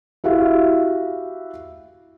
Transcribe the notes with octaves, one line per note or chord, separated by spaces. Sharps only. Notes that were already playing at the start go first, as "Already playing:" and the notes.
E4 F#4 G4 E5 F5